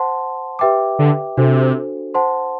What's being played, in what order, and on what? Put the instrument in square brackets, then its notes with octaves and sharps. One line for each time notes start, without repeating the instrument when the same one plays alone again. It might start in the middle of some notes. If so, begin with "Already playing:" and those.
Already playing: [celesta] C5 F#5 A5 C6
G4 B4 E5 G5 D6
[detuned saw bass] D3
[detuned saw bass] C3 [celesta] D4 F#4 A4 C5
[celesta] C5 F#5 A5 C6